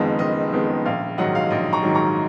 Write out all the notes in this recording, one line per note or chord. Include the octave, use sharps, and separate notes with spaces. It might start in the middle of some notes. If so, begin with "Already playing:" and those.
Already playing: F#1 F2 D#3 G#3 B3 D#5 F5
F#1 D#5
F2 D#3 G#3 B3
A#1 F5
G#2 D#3 F#3 D#5 F#5
F5
A#1 D#5
A#5 C#6
G#2 D#3 F#3
A#5 C#6